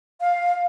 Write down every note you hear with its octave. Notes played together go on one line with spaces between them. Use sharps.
F5